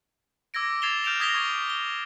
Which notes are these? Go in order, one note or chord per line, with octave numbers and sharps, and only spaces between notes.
D6 E6 G#6 A#6 D7
G#6 A6 C7 E7 F7 G7
F6 G6 D7 E7 F7
D#6 G#6 A#6 B6 F7 G7
C#6 G#6 D7 F7
G7